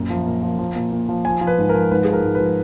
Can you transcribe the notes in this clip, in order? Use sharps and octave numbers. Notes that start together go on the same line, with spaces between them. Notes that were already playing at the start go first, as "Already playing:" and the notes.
Already playing: F#2 A#2 A#5
F3
A#2
F3
F3
A#2
A#2
F3
F3 G#5
F3
B4
G#2
F3 A#4
G#2 B4
F3 G#4
A#4
G#2
F3 B4